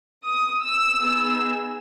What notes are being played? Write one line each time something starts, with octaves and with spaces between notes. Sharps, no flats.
D#6
E6
B3 D#4 G#4